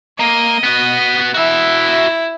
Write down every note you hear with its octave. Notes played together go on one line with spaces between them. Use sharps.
A#3 D#5
B3 F#4
E4 F#4 E5